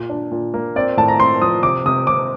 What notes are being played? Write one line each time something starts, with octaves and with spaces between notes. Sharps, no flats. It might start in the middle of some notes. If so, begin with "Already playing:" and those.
Already playing: A#2
D4
A#2
A#3
C4 D5
A2 A5
A#5
C4 C6
F3 D#6
C3 D6
C3 D#6
C3 D6